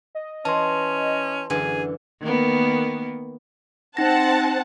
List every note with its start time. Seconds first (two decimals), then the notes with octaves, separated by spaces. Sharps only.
0.15 D#5
0.45 E3 C#4 A5 C6
1.50 F#2 D3 E3 G#4
2.21 D#3 A#3 B3
3.97 C4 D#4 F#5 A5 A#6